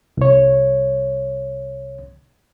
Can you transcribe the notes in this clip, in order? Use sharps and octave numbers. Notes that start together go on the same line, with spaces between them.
C2 C#5